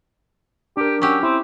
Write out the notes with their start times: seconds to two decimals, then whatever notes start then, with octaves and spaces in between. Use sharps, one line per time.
0.77 D4 G4 A#4
1.02 F#3 C#4 G4
1.23 C4 E4